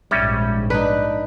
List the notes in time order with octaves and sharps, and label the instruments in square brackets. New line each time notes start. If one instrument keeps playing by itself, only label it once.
[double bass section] A#1 G#2 [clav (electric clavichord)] G3 C#4 [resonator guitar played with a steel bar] E5
[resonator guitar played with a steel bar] D4 [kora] D#4 B4